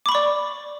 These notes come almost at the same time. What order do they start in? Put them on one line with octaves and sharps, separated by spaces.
D6 B5 C#6 D5